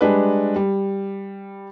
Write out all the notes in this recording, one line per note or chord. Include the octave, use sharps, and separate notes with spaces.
G3 G#3 D4 B4
G3